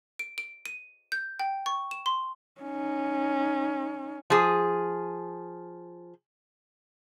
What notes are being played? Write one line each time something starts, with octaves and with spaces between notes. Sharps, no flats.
D7
D7
D#7
G6
G5
C#6
E7
C6
C#4 D#4
F3 G#4